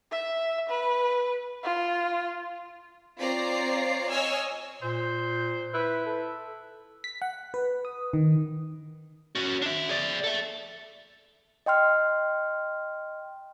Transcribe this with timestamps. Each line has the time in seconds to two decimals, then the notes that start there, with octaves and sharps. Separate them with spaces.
0.12 E5
0.69 B4
1.64 F4
3.18 C4 F4 C#5 D5 A#5 C7
4.09 C#5 D#5 G#5 E6 F6
4.83 A#2 C5
5.74 E4 B4
6.06 A4
7.04 B6
7.22 F#5
7.54 B4
7.85 D#6
8.13 D#3
9.35 C#4 F#4
9.62 D4 E5
9.89 G#4 D5
10.24 A4 E5
11.66 D#5 G5 C6 F6